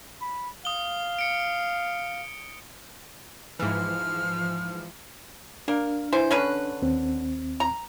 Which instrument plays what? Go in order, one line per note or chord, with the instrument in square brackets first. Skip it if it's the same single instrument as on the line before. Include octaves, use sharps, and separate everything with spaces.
[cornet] B5
[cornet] F5 [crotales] D#6 G7
[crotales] C#7 D7
[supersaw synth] G#2 E3 [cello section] F3 [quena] F6
[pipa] A#3 A#4 [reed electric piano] D4
[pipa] E3 C5
D3 C#4 B4
[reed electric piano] D#2 C4
[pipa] A#5